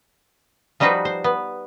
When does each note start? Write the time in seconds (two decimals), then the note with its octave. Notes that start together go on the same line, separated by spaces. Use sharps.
0.80 F3 G3 D#4 F#4 B4 C5
1.05 C5
1.24 B3